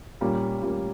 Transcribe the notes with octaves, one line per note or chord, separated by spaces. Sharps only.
A#2 G3 A#3 C#4
A#2 G3 A#3 C#4